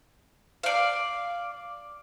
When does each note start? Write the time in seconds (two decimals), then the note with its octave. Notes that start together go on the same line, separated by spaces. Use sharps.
0.63 D5 F5